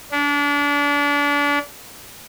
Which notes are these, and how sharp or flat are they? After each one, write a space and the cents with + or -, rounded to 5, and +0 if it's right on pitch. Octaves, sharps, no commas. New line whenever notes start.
D4 -30